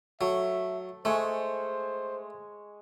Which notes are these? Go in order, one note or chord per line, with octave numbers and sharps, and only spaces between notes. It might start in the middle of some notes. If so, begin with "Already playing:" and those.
F#3 A3 E5
G#3 A3 C5 G#5 C#6